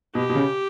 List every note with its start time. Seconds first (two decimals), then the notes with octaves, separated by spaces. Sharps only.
0.15 B2 G4
0.29 B2
0.35 C#3